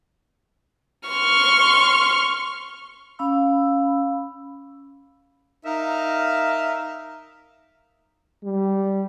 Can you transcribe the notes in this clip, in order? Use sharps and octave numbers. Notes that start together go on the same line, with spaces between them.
C6 C#6 F6
C#4 F5 B5 E6
D#4 A#4 E5 F5
G3